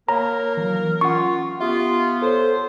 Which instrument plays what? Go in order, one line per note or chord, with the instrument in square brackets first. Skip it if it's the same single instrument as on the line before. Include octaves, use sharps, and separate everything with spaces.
[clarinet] A#3 [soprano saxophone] A#4 [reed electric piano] C#5 [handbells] A#5
[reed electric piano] E3 F#3
[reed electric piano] C#4 F#5 [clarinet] F4 [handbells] C#6
[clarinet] B3 [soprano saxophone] F4 [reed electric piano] G4 E5
[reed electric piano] A4 C#5 [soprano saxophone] C5